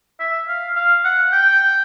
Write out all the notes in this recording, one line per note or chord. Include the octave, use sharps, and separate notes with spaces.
E5
F5
F5
F#5
G5